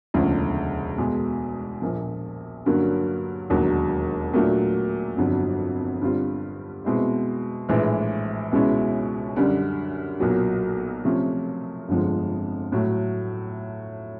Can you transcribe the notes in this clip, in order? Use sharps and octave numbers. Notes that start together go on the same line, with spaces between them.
E1 D2 C#3 F3
E2 B2 G#3
A#1 A#2 F3
G2 D3 F#3 A#3 C#4
E1 D#2 D3 F#3
A#2 F#3 A3 D4
G1 F2 D3 F#3
G2 D3 G3 C4 F4
B2 G#3 C4 E4
A#1 A2 E3 G#3
C#2 B2 G#3 C#4 E4
F#2 D3 G3
B1 A#2 F#3
C3 F3 A3 C#4 F4
G1 F2 D3 F3 G#3
A2 F#3 A3